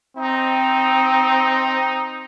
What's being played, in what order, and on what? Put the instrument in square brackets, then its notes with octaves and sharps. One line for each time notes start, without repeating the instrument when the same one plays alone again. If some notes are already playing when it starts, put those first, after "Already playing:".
[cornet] C4 [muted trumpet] D#4